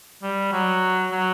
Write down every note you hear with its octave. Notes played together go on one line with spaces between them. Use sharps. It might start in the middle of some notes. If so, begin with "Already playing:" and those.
G3
F#3
F#3